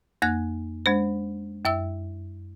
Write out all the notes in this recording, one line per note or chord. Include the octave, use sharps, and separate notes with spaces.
F2 A#3 F#6
G#3 D4 C5
F#2 E5 E6